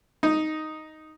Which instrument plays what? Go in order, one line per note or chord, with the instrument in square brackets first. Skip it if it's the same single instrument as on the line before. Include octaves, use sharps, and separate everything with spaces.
[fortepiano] D#4